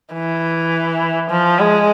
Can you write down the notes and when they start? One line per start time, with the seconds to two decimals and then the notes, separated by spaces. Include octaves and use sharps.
0.14 E3
1.30 F3
1.60 G#3